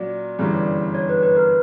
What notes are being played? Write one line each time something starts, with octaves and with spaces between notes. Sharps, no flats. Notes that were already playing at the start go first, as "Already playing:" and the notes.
Already playing: A#2 F#3 C#4 F#4 D5
G1 F#2 C#3 E3 G3
C#5
B4
B4
A#4